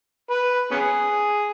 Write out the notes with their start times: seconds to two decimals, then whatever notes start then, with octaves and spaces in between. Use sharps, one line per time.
0.30 B4
0.71 B3 C#4 G#4